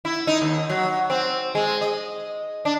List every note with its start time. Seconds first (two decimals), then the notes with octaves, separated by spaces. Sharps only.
0.05 E4
0.27 D#4
0.42 D#2
0.70 F#3
1.10 C4
1.55 G#3
1.81 D#5
2.65 D4